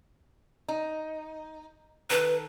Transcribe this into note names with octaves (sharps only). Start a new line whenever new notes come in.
D#4
D#3 A4 B4